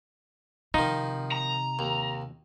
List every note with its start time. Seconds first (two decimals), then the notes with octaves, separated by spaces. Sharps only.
0.74 C3 D#3 F3 D#4
1.32 A#5
1.79 D#2